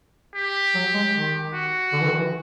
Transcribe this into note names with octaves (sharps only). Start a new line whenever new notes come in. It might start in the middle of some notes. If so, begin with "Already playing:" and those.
G4
F#3
G#3
D#3
F#4
D3
E3
D#3
E3